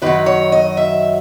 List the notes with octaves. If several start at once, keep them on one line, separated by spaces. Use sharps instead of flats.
F#2 D#3 F#3 B4
C#5
D#5
E5